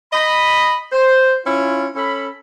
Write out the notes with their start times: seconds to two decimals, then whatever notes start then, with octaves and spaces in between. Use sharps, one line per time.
0.13 D#5 B5
0.92 C5
1.45 C#4 E4 F4
1.96 C#4 A4 B5